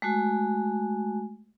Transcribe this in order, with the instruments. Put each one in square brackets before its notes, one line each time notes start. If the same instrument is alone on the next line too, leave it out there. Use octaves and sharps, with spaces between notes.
[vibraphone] G#3 A3 F#4 G#5